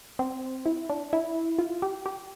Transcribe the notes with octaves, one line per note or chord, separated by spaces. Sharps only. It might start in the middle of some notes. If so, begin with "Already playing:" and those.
C4
E4
D4
E4
F4
G4
G4